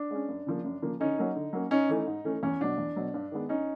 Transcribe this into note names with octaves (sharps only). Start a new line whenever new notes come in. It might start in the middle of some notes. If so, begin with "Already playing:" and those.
Already playing: D4
G#3 C#4
F#2
C#3 F3 A#3
F#2
C#3 F3 A#3
D3 C#4 D#4
F#3 A#3 C#4
D3
F#3 A#3 C#4
G#2 C#4 D#4
E3 A3 C#4
G#2
E3 A3 C#4
E2 C#4
B2 F#3 D4
E2
B2 F#3
G2
D#3 G#3 B3
G2 C#4 D#4